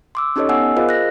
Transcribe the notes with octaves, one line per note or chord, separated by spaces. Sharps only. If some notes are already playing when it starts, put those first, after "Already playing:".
C6 D6 E6
C#4 D#4 G4 A4 C#5 D#5
B3 F#5 G#5 E6
F4 G#4 A#4 C5 D#5 F5
F#6 A#6